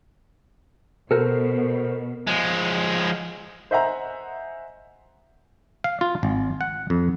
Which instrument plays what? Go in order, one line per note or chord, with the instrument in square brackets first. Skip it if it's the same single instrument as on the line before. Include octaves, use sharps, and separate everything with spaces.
[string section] B2 [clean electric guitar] A4 A#4 C5
[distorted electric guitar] F3 G#3
[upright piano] C5 D#5 E5 F#5 G#5 A#5
[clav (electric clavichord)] F5
F4
G#1
F#5
F2